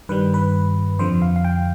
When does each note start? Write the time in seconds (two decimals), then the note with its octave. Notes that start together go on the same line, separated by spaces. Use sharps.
0.09 G2 D#3 G3 B4
0.34 B4
0.99 F2 D3 F3 C5
1.22 F5
1.36 F5
1.44 G5